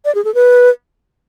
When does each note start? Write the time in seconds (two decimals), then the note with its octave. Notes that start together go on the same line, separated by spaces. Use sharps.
0.05 D5
0.15 G#4
0.25 A4
0.34 B4